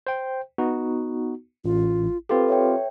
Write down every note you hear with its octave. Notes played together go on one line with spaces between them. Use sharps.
C5 G5
B3 D#4 F#4
A1 F4
C4 F4 G4 A4 B4
C#5 E5 G5